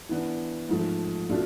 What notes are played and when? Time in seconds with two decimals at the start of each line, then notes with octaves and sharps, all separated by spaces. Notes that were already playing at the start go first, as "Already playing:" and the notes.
0.09 E3 B3 D4
0.69 G#2 F3 A3
1.29 B2 A3 D4 F4